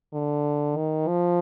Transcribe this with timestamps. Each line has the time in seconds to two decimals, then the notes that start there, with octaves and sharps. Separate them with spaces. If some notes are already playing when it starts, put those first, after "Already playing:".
0.13 D3
0.77 D#3
1.08 F3